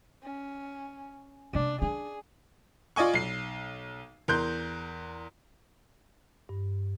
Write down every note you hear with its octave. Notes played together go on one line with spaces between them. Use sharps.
C#4
C3 A#3 D4
D4 G#4
F4 D5 D#5 G#5 C#6
B1 C7
E2 A#4 C6 F#6 G6
G2